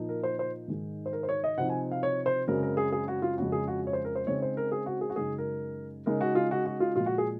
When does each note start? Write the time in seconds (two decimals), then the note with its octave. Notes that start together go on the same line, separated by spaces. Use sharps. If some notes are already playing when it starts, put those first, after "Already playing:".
Already playing: A#2 F3 A#3 D#4
0.09 A#4
0.23 C5
0.39 C5
0.68 G#2 D#3 G#3
1.06 C5
1.13 A#4
1.23 C5
1.29 C#5
1.44 D#5
1.58 C3 F3 C4 D#4 F#5
1.70 G#5
1.92 F5
2.03 C#5
2.26 C5
2.47 F#2 C#3 G#3 C4 A#4
2.63 A#4
2.77 G#4
2.92 G#4
3.08 F#4
3.22 F4
3.37 F2 C#3 G#3 F#4
3.52 G#4
3.68 F#4
3.87 C#5
3.93 C5
4.05 A#4
4.16 C5
4.26 C#3 G#3 C4 D#4 C#5
4.42 C5
4.57 A#4
4.72 G#4
4.86 F#4
5.01 G#4
5.10 F#4
5.16 F#2 C#3 G#3 D#4 G#4
5.38 A#4
6.06 C#3 G#3 D#4 A#4
6.21 F#4
6.35 F4
6.51 F#4
6.66 F#4
6.80 F4
6.96 A#2 F3 G#3 F4
7.06 F#4
7.18 G#4